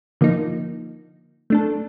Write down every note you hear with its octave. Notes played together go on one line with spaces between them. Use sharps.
D3 F3 A#3 D#4
A3 D4 A4